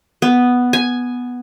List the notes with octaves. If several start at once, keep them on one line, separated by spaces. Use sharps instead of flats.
B3
G#5